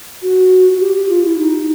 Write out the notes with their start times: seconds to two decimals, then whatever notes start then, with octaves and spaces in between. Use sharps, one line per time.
0.23 F#4
0.73 F#4
0.81 G4
0.95 G4
1.10 F4
1.25 E4
1.39 D#4